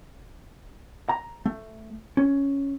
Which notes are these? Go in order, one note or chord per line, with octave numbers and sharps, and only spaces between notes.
A#5
A3
C#4